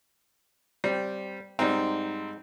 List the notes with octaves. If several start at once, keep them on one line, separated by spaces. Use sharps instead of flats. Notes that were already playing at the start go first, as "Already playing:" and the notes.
G3 C4
G#2 G3 C4 D#4